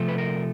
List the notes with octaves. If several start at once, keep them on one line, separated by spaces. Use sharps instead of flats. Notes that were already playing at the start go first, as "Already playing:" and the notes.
Already playing: C3 F3 A3
B4
A#4